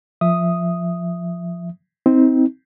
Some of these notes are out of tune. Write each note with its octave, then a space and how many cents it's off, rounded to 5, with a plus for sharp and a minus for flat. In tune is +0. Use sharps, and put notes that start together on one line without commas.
F3 +0 E5 +5 D#6 +0
C4 -5 D#4 +35